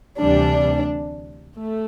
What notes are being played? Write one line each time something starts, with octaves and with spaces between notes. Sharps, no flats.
D2 C3 E3 G3 D4
A3